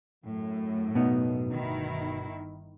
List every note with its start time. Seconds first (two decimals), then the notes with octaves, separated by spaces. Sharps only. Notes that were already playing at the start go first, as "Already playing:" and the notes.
0.24 F#2 A2
0.95 B2 B3 D#4
1.52 G1 D#3 E4